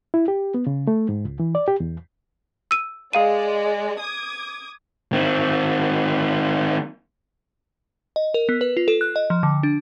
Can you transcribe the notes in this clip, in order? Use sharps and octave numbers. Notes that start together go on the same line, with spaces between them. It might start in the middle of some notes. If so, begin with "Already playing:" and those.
E4
G4
B3
C#3
A3
G#2
C#2
E3
D5
G4
E2
E6 D#7
G#3 G#4 D5 F5 D#7
D6 D#6 G#6
D#3 C4
D#5
A#4
B3
B4
F4
A4
F#6
D#5
F3
D3
D4